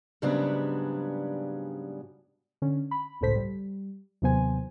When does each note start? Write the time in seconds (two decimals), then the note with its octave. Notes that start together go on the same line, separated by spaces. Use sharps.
0.22 G#2 C#3 F#3 G3 B3 D4
2.62 D3 C#4
2.91 B5
3.21 G1 C#2 A2 A4 C5 B6
3.36 G3
4.22 D#2 C3 F#3 B3 C5 G#5